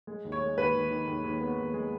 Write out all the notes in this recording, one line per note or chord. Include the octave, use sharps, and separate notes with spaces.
G#3
D#2
C#5
G#3
D#2 B4
D#2
D#3
D#2
D#2
B3
D#2
G#3